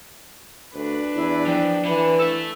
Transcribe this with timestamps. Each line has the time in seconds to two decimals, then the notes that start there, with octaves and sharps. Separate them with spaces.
0.75 D2 D4 B4
1.15 E2 E4
1.47 F3 G5
1.85 D3 E3 B5
2.19 A4 E5 E6